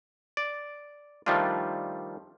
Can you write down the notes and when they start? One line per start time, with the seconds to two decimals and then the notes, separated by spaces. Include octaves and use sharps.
0.37 D5
1.26 D#3 F3 G3 A3 D4 F4